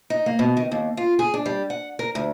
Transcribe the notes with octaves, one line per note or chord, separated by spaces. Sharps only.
D#4
A#3
B2
D#3
D#2
F4
G#4
D4
G3
F#5
A#4
D2